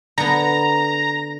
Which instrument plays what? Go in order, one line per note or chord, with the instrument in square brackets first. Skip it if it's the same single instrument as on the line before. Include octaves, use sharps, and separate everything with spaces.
[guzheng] D3 B3 [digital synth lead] A#5